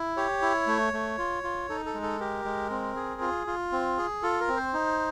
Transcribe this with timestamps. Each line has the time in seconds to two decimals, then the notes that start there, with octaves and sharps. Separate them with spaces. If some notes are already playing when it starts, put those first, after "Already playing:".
Already playing: E4
0.17 G4 C#5
0.42 E4
0.67 A3
0.93 A3
1.18 F4
1.44 F4
1.69 D#4 A4
1.86 A4
1.94 G#3
2.02 A4
2.20 G4 A#4
2.45 G#3
2.70 C4
2.96 G#4
3.21 F4
3.47 F4
3.72 C4
3.98 G#4
4.22 F4 A4
4.41 A#4
4.48 C4
4.57 C5
4.74 D#4